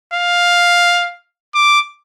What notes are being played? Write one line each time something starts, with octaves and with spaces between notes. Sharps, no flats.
F5
D6